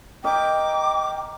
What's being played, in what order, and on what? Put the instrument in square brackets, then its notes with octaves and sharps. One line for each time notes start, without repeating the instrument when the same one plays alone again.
[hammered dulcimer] A#4 D#5 [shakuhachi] G5 [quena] D6